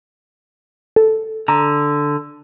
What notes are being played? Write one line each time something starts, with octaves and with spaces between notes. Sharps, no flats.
A4
D3 A#5